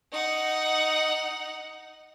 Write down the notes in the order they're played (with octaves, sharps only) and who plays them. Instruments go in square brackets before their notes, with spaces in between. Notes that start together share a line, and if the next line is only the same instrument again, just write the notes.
[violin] D#4 F#5